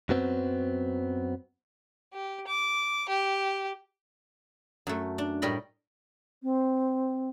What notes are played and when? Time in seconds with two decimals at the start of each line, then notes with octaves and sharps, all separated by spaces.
0.09 F#2 F#3 B3 C4
2.13 G4
2.47 D6
3.09 G4
4.87 F#2 A3
5.18 D4
5.42 A2 G3 A#4 D#5 B5
6.43 C4